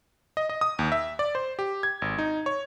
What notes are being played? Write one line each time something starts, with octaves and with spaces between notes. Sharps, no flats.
D#5
D#5
D#6
D#2
E5
D5
C5
G4
G#6
G#1
D#4
C#5